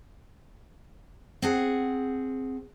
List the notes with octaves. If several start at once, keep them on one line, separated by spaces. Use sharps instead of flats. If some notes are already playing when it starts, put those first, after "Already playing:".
C4 G#4 F#5